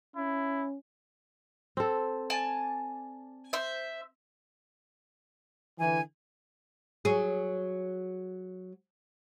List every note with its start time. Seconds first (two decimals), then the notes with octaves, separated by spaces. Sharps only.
0.16 C#4 E4
1.77 C4 A4
2.30 D5 G#5 A5
3.53 C5 E5
5.79 D3 E3 G#5
7.05 F#3 G#4